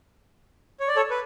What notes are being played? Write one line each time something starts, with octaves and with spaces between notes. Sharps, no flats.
C#5
D5
A4 C#5
B4